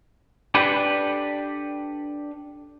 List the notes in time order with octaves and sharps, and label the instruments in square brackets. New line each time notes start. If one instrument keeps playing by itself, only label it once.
[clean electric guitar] D4 G4 A4 B4